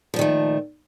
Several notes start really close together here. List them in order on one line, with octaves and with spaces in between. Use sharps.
F3 A#2 D#3 A3